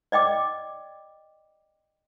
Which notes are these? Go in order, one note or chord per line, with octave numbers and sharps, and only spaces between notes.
D5 D#5 G5 D6